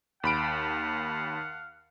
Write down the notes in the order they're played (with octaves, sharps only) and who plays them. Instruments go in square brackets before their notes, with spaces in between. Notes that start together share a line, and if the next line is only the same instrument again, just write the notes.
[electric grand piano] D#2 B5 D7 [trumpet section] F5 F#5